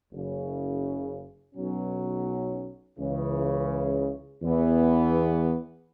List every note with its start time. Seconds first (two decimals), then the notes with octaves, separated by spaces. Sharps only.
0.12 F#1 F#2 C#3
1.55 B1 B2 F#3 C#4
2.99 C#2 C#3 E3
4.43 E2 E3 B3